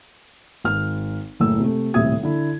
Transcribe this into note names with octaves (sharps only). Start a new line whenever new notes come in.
G#1 F6
F#1 A2 E6
C3 A3
D#1 A2 C3 E5 D#6 G#6
D3 E4